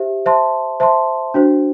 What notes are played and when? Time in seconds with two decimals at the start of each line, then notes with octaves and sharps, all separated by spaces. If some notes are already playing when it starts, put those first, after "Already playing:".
Already playing: G4 C5 E5
0.26 C5 E5 A5 C6
0.80 C5 E5 A5 C6
1.34 D4 F#4 C5